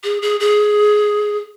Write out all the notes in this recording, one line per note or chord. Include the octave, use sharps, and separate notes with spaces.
G#4
G#4
G#4